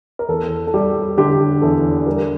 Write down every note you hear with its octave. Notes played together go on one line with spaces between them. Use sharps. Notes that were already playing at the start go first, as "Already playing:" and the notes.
A#4
E2 A4
A4
G3 G4
D3 G4
E2 A4
G3 G4 A#4